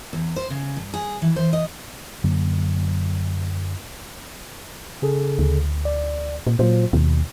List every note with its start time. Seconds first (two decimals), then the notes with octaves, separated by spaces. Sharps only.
0.13 E2
0.36 C5
0.50 C#3
0.77 G2
0.94 G#4
1.22 E3
1.36 C5
1.53 D#5
2.24 F#2 D3 F#3 A#3
5.02 C#3 G#4 A4
5.39 D2
5.85 D5
6.47 A#2
6.59 A#2 F#3 F4 C5
6.93 D#2 B2